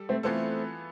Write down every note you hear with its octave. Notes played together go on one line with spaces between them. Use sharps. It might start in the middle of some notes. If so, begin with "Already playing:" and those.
Already playing: G3 A4
A3 C4
E3 A3 B3 C4 F4 A4